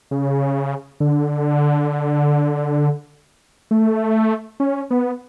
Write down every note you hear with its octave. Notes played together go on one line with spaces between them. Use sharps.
C#3
D3
A3
C#4
B3